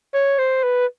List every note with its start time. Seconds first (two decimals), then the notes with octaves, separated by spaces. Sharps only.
0.14 C#5
0.39 C5
0.63 B4